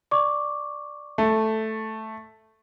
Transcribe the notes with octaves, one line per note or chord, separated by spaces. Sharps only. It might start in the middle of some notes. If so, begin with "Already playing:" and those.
D5 C#6 D6
A3